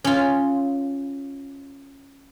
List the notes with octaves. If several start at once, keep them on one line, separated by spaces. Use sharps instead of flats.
C#4 F4